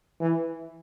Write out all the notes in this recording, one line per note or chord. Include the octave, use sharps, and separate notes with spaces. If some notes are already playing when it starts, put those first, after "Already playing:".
E3